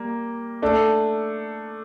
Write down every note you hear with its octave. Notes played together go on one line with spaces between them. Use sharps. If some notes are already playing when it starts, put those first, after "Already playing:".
Already playing: G3 A#3
A3 D4 A4